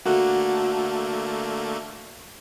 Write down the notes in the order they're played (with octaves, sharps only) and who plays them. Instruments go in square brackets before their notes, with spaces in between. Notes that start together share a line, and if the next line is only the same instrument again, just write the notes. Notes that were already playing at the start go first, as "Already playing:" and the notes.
[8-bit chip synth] D3 A3 A#3 [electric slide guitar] F#4